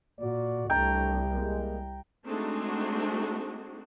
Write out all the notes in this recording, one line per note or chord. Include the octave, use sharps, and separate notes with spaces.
A#2 F#4 D5
C2 G2 A3 D4 G5 A#5
G#3 A#3
G#3 A3 C4 D4 D#4 F#4